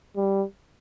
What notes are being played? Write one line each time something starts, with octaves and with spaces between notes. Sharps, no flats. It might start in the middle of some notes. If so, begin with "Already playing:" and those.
G3